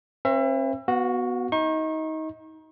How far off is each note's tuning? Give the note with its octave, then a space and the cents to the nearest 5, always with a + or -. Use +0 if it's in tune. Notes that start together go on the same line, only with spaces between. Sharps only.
C4 +45 B4 +0 E5 +30
B3 +0 F#4 +0 F5 +45
D#4 +25 C#6 -35